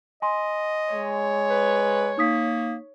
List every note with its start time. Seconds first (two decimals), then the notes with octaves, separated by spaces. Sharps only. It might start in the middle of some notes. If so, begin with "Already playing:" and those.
0.22 D#5 G#5 C6
0.93 G#3 C#5
1.50 B4
2.18 A#3 D#4 D#6 B6